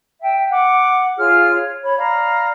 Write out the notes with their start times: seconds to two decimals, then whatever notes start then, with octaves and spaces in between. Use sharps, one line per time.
0.20 E5 G5
0.50 F#5 D6
1.17 F4 G#4 C#5 F6
1.53 C#5
1.82 C#5 B5
1.97 D5 F5 A#5 B5